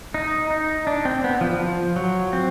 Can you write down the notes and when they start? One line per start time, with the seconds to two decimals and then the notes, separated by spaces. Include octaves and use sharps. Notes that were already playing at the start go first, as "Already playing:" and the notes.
0.14 D#4
0.51 D#4
0.87 D4
1.05 C4
1.24 B3
1.41 F3
1.60 F3
1.96 F#3
2.33 C4